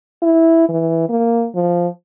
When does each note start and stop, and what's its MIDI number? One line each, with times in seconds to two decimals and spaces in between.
0.22 0.67 64
0.69 1.05 52
1.10 1.47 58
1.55 1.88 53